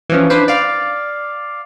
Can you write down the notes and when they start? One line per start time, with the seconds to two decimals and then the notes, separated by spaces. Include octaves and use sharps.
0.10 E3 F3 C#4
0.30 D4 B4 C5
0.48 D5 F5